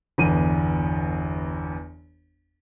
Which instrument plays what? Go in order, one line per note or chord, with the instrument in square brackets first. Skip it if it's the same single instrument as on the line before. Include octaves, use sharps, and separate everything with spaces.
[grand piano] G1 E2 D#7